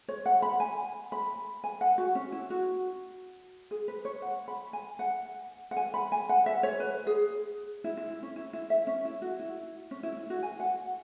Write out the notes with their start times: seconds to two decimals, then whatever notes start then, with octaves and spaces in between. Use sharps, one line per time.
0.08 C#5
0.26 F#5
0.42 B5
0.60 G#5
1.12 B5
1.64 G#5
1.81 F#5
1.98 F#4
2.15 C#4
2.32 E4
2.50 F#4
3.71 G#4
3.88 B4
4.05 C#5
4.22 F#5
4.48 B5
4.73 G#5
4.99 F#5
5.71 F#5
5.77 G#5
5.94 B5
6.12 G#5
6.29 F#5
6.46 E5
6.63 C#5
6.80 B4
7.07 G#4
7.84 E4
7.97 E4
8.10 E4
8.23 C#4
8.36 E4
8.53 E4
8.70 E5
8.87 C#4
9.05 E4
9.22 F#4
9.40 E4
9.91 C#4
10.03 E4
10.17 E4
10.30 F#4
10.43 G#5
10.60 F#5